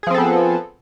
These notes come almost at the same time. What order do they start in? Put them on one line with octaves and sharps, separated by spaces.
G#4 F3 C4 A4 B3